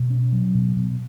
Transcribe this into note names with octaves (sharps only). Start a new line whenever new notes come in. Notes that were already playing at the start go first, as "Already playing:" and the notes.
Already playing: B2
C#4
F#3
B2
B2